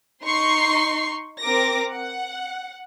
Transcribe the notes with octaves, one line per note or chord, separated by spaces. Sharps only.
D#4 C6 C#6 C7
C4 A#4 D6 A#6
F#5